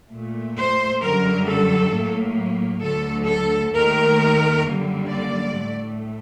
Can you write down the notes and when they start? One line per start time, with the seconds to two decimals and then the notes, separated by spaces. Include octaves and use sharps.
0.12 A#2 A3
0.57 C5
1.02 F#2 D3 G3 A#4
1.47 A4
1.93 A2 F#3 A#3
2.83 D2 D3 F#3 A4
3.28 A4
3.74 D#2 D#3 A3 A#4
4.64 F#2 D3 G3 A#3
5.11 D5
5.56 A2 A3